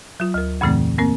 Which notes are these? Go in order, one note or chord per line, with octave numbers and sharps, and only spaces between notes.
F#3 F4
D2 A#4
F2 A#2 C#3 E3 A3 C4
A#3 C4 A#4